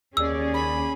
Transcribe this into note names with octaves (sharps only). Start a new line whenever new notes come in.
D#2 C#4 G#4 D5 E6
B5